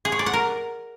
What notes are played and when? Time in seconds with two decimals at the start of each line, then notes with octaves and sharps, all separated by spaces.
0.05 G#4
0.12 C#5
0.19 D5
0.26 F#5
0.33 A#4